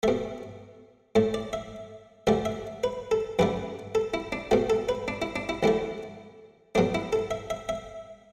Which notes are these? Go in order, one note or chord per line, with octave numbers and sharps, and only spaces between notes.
B2 A3 E5
A2 A3
D5
E5
D2 D3 A3 E5
E5
B4
A4
F#2 D3 A3 B4
A4
E4
D4
B2 A3 F#4
A4
B4
D4
E4
D4
E4
D2 D3 A3 E4
B2 F#3 A3 D4
E4
A4
E5
E5
E5